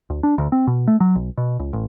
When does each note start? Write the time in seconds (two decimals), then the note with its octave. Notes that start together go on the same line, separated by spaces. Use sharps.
0.10 D2
0.23 D4
0.38 D2
0.52 C4
0.67 B2
0.88 A3
1.00 F#3
1.15 B1
1.37 B2
1.60 C#2
1.73 A1